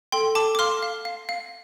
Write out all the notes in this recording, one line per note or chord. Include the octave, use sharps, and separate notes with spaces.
A4 G5 C6
A4 A5 D6
D6
F5 C6 F6
F5
F5
F5